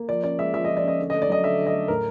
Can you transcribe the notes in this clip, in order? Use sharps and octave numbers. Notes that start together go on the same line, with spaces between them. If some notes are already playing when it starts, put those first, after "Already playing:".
Already playing: A#3
F3 D5
C#4 D5
G#3 E5
F3 E5
F3 D#5
D5
C#4 D#5
D3
A3 D#5
D5
F#3 D#5
D3 E5
D3
D#5
A3
A2 A#4